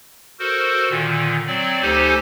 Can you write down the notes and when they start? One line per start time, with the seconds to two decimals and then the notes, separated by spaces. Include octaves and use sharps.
0.39 F#4 A4 A#4 C5
0.89 A#2 D3 D#3
1.47 F#3 C4 D5
1.82 D2 D#4 G4 A4 C5 G#5